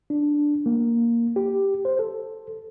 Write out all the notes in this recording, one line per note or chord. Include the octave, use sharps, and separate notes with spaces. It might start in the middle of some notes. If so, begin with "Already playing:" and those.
D4
A#3
G4
C5
A4